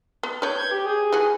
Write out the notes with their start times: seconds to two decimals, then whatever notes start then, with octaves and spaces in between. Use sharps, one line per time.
0.23 B3
0.42 B4 C#5 G6
0.58 G#6
0.71 G4
0.86 G#4
1.12 E3 F#4 G#5